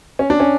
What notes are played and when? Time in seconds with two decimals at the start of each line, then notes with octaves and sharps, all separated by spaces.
0.19 C#4
0.30 D4
0.40 C#4